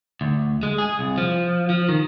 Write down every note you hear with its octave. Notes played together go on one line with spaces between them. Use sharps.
D2
G#3
G#4
C2
F3
F3
D#3